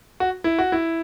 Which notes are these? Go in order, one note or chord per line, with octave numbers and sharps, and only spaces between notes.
F#4
E4
F#4
E4